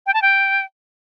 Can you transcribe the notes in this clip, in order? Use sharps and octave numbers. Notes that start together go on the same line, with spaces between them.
G5
A5
G5